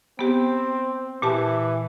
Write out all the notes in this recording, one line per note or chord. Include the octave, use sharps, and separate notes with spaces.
B3 C4 G4
A#2 E3 G4 A5